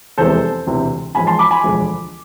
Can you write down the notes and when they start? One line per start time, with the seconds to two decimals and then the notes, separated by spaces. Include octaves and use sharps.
0.18 F1 E2 C3 E3 G#3 A4 C5
0.67 E1 D2 C3 E3
1.15 A1 G#2 F3 G#3 G#5 B5
1.27 A5 C6
1.39 B5 D6
1.51 G#5 B5
1.63 E1 D2 D3 F3 G#3